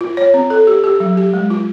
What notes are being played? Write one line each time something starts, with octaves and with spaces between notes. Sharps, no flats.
F4
C#5
C4
A4
G4
G4
F#3
G4
G#3
F4